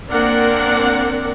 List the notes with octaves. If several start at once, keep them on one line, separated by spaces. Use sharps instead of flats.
A#3 C4 D4 A#4 D5 F#5